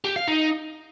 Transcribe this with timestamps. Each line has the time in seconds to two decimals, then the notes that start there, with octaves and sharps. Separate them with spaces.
0.04 G4
0.16 F5
0.28 D#4